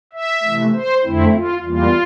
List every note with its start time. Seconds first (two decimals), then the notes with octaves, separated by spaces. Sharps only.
0.13 E5
0.43 C3 E3 A3
0.73 C5
1.03 F2 D3 A3 C4 E4
1.33 F4
1.63 E2 E3 G3 A#3 F4